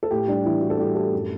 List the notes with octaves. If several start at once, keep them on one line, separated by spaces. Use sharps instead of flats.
A4
A2 G4
G3 D4
E3 E4
A2 F#4
A4
G3 G4
A2 A4
F#2